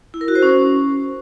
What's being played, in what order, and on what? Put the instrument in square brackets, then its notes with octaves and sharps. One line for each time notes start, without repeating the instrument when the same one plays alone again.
[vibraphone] E4
A#4
F#4
C5
C#4